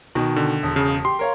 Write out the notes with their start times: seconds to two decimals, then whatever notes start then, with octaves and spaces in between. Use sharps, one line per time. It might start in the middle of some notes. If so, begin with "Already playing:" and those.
0.15 B2 D#3
0.36 D3
0.63 E1
0.76 C#3
1.05 G4 C6
1.19 A#4 C#5 F5